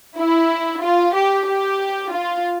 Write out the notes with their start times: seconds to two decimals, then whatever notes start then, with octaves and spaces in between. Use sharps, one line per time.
0.18 E4
0.83 F4
1.16 G4
1.48 G4
2.13 F4